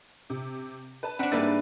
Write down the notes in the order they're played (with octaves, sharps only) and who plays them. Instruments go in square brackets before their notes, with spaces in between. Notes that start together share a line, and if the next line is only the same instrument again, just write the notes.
[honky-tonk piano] C3
B4 A5
[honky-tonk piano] C4 F#5 [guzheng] D4 B4
[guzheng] G#2 G3 E4 [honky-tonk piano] A#3 B4 A6